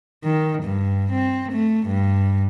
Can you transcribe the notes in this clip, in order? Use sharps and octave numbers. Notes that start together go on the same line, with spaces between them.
D#3
G2
C4
A3
G2